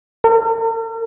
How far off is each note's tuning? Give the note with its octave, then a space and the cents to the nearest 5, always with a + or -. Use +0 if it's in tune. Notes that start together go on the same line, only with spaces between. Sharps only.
A#4 -45